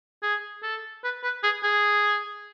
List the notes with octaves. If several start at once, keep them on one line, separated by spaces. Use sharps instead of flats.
G#4
A4
B4
B4
G#4
G#4